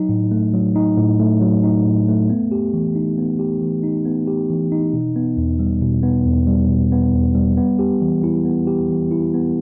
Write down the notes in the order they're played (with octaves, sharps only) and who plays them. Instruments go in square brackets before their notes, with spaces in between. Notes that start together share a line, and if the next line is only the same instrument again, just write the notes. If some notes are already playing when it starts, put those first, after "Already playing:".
Already playing: [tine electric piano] F#3 D#4
A2
A3
F#3
D#4
A2
A3
F#3
D#4
A2
A3
B3
G4
E3
D#4
B3
G4
E3
D#4
B3
G4
E3
D#4
B2
B3
E2
G3
B2
B3
E2
G3
B2
B3
E2
G3
B3
G4
E3
E4
B3
G4
E3
E4
B3